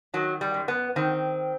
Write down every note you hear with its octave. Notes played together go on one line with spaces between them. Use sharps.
D#3 F#3
G3
F#2
B3
D#3 C4